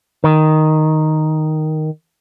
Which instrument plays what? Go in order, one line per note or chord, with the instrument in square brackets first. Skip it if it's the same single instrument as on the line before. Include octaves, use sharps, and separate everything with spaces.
[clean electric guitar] D#3